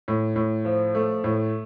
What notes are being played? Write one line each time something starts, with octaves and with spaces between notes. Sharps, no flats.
A2
A2
F3
A3
A2